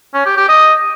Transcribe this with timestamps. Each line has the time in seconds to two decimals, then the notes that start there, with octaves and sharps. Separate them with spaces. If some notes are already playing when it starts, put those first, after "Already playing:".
0.14 C#4
0.26 G4
0.37 G4
0.49 D#5